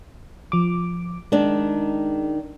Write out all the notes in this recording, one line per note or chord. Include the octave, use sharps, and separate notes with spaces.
F3 D6
D#3 G#3 D4